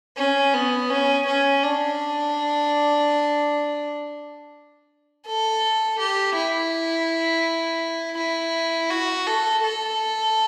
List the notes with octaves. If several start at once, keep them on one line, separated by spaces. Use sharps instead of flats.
C#4
B3
C#4
C#4
D4
A4
G4
E4
E4
F#4
A4
A4